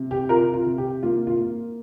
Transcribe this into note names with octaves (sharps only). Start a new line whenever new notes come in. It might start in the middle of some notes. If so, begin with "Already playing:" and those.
Already playing: C3
G4
C3 F4 A#4
F4
C3
G4
A#3 F4
F4
A#3